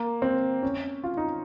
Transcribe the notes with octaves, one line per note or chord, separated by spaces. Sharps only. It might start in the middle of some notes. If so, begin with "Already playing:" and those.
Already playing: A#3
C4
C#4
F4
D#4